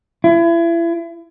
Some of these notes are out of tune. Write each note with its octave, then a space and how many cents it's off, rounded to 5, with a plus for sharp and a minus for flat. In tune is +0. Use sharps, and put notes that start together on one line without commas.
E4 +35